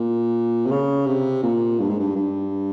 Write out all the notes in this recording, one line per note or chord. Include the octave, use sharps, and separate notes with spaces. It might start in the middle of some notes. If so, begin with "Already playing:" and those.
Already playing: A#2
C3
C#3
C3
A#2
G2
G#2
G2
G2